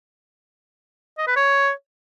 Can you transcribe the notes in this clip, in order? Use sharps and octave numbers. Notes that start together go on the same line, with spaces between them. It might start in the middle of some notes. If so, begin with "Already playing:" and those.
D#5
B4
C#5